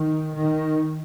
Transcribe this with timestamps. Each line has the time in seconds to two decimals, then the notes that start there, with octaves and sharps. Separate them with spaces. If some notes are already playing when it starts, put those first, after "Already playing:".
Already playing: D#3
0.36 D#3